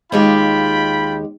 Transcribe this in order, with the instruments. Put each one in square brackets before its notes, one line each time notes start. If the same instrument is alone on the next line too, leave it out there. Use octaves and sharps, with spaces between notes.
[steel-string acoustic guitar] D#2 G#3 G4 [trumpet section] F4 G5 B5